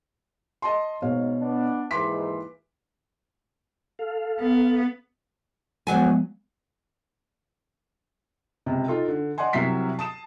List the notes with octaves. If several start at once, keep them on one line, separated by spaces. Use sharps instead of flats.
D#5 A5 C6
G#2 B2 C#5 F5
B3 D4
D#2 G#2 E3 C6 D6 B6
A4 F5
B3
D2 F3 F#3 G#3 B3 G#5
C#2 C3
D#4 F4 A4
D3
D5 D#5 F#5 G#5 C6
C2 C3 F#3 E5 B6 C7
A5 D#6 E7